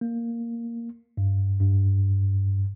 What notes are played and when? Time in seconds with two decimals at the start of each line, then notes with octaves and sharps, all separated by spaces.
0.01 A#3
1.17 G2
1.61 G2